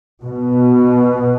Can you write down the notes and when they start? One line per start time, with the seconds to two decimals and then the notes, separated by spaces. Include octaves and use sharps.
0.24 B2